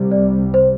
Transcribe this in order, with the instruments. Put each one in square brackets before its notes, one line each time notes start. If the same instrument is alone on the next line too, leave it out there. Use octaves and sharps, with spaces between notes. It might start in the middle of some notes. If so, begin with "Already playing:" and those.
Already playing: [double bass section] C2 C3 G3
[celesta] D5
C5